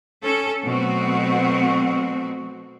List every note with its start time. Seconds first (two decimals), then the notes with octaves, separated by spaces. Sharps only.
0.24 C#4 A4
0.63 B2 F#3 A3 C4 F#4